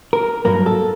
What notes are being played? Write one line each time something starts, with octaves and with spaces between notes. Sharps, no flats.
A#4
G2 F#3 A#3 A#4
A4